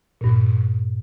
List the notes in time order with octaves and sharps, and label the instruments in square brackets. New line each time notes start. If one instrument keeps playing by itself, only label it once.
[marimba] G2 A#2